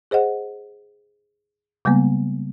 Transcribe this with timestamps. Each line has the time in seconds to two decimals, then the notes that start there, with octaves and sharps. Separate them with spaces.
0.11 G#4 C5 D#5 F#5
1.85 C#3 G3 G#3 A#3 B3